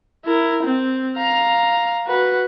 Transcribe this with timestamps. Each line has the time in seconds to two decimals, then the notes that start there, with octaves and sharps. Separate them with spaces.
0.25 E4 A#4
0.63 C4
1.17 F5 A#5
2.07 F#4 B4